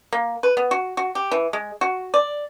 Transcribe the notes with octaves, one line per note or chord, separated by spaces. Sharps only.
A#3
B4
B3
F#4
F#4
G4
E3
G#3
F#4
D5